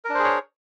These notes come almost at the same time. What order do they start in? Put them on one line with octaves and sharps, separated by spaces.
A#4 D4 C5 G#4 C#5